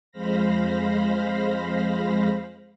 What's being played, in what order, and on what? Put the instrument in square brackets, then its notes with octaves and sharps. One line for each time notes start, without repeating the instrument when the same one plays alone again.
[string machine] F2 G#3 C5 F5 B5 A#6